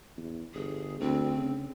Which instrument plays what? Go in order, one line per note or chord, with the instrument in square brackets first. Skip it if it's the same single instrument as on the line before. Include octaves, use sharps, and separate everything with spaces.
[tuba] E2
[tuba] G1 [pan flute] G#4
[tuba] D2 [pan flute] C4
[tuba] C#3